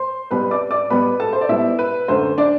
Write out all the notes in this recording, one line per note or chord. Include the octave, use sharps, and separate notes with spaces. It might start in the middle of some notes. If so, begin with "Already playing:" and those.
Already playing: C5 C6
C2 B2 G3 B3 B4 B5
D5 D6
D5 D6
B2 G3 B3 B4 B5
A4 A5
C5
D5
B2 G3 B3 E4 E5
B4
F#2 D3 A3 C5
D4 D5